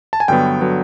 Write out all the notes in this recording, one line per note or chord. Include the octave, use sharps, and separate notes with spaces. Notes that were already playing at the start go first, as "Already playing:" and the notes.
A5
G#5
G2 D3 F#3 B3 G5
D3 F#3 B3